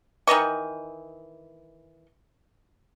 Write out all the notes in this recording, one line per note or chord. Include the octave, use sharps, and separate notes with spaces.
D#3 E3 D#5 C#6